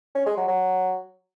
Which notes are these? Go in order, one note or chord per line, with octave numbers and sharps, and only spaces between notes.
C#4
G#3
F#3
F#3